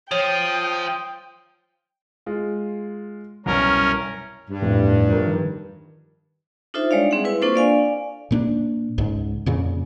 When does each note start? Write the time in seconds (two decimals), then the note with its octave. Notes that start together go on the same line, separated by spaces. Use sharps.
0.12 F3 C#5 G5 D#6
2.26 G#3 F4
3.46 C2 F#2 B2 C#4 A#4
4.50 G2
4.62 F2 A2 A3
5.08 F3 A#4
5.27 D#3
6.74 D4 D#4 F4 A4 C5 E5
6.91 G3 G#3 C#5 D5 F5
7.11 C4 G#4 E5 F#5
7.24 C4 E4 B4
7.41 A#3 D4 F4 A4 C5 C#6
7.55 D5 F5 G#5
8.31 A#2 A#3 D4
8.98 C#2 G#2
9.46 F2 A#2 C#3